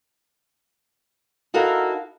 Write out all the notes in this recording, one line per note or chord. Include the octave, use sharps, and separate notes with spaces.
D#4 E4 F#4 A4 A#4 F5